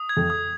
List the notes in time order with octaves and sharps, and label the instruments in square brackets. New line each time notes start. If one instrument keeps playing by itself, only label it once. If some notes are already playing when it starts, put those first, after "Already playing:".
Already playing: [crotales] D#6
G#6
[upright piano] F2
[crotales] D#6